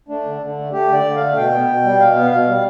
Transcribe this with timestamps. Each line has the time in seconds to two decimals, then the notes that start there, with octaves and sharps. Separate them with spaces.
0.08 A3 D4
0.25 D3
0.41 D3
0.57 A3
0.72 A3 G4
0.88 D3 D5
1.04 D3
1.15 A3 F5
1.35 B2 G5
1.51 B3
1.68 B2
1.84 G3
2.00 B2 F5
2.15 B3
2.31 B2 F5
2.47 G3